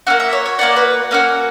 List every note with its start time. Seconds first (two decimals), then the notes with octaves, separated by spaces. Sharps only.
0.07 A#3 C#4 F#4 F#5
0.20 E5
0.33 C#5
0.46 C#5
0.59 A#3 C#4 F#4 D5
0.76 B4
1.11 A#3 C#4 F#4